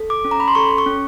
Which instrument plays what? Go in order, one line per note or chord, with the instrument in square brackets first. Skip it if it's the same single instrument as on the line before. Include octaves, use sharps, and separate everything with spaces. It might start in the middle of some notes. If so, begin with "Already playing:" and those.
Already playing: [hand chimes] A4
D6
C#4
A#5
B5
C6
A4 C#6
C#6
C#4